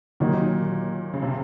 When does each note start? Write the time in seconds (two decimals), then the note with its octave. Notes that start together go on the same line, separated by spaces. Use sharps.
0.20 D#2 A#2 D#3 F#3 A#3 D#4
1.13 C#3
1.22 C3